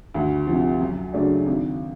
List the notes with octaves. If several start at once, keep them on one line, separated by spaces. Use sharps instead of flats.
D2
C3 F3
F#2
C#3 F#3 A3 D4
G#1